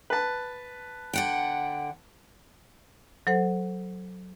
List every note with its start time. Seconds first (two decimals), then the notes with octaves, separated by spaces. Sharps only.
0.10 B4 A5
1.13 D3 F#5 G5
3.27 F#3 A4 C5 F#5